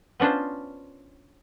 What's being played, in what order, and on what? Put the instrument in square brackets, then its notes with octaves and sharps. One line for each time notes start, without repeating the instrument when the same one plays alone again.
[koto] B3 C#4 D4 F4 C5